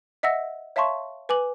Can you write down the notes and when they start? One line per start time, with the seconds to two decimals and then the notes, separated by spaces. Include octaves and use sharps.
0.23 D#5 E5 F#5 E6 A#6
0.76 C#5 E5 F5 A5 C6 C#6
1.29 B4 G#5 D6 F#7